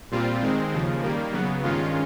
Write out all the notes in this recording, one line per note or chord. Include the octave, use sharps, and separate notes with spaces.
A#2 G3 C4 F4
D#3 G#3 C4
D#2 C#3 F3
D#3 G3 A#3
C#3 F#3 B3
G2 D#3 G#3 C#4 F4